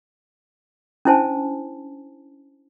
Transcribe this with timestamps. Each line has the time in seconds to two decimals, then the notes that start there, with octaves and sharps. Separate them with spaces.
1.05 C#4 D4 E4 C5 G#5 A5